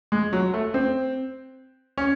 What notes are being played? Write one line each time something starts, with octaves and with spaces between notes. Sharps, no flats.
G#3
F#3
A3
C4
C#4